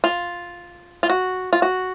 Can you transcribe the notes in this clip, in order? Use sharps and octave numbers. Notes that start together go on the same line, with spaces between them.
F4
F4
F#4
F4
F#4